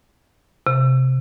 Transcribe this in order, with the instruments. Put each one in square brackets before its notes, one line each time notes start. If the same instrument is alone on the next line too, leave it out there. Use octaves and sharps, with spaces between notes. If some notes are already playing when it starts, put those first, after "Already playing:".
[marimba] C3